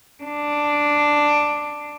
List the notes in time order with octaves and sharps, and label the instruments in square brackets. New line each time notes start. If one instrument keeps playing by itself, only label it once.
[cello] D4